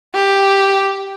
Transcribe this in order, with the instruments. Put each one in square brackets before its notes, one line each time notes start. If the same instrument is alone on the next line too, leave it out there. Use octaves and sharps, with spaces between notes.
[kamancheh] G4